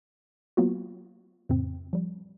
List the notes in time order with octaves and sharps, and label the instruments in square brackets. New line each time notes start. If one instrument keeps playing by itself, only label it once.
[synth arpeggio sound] F#3 A#3 B3 F4 F#4
F2 A2 C#3 C4
F3 G3